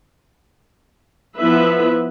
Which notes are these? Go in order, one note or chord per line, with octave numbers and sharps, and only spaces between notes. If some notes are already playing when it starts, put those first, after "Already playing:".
F3 B3 E4 B4 E5